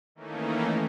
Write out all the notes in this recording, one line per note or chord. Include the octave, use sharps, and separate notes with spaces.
D#3 E3 A3 A#3 C#4 D#4